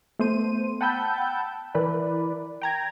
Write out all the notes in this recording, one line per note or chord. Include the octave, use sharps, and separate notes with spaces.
A3 B3 C5 D#7
F#5 G5 A5 B5 E6 G6
E3 A#4 B4 D5
G5 A#5 G#6